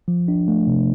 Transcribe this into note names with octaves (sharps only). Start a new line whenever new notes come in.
F3
D4
A3
C3